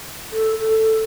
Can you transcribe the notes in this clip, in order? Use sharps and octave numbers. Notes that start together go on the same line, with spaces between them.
A4
A4